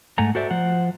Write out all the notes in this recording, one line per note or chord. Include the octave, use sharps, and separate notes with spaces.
G#2 A3 F#5 G#5 A#5
F#4 A4 C5 D5 E5
F3 C5 F#5